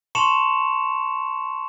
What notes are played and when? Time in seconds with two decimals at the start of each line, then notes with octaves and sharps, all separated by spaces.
0.15 A5 C6 C#6 C#7 E7 F7